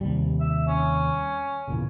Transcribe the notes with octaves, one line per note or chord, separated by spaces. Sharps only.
D#2 C3 G3
E5
C#4
E2 A#2 C#3